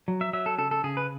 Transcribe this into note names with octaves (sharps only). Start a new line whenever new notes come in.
F#3
E5
F#3 E5
A4
C#3 A4
A4
C#3 G#4
B4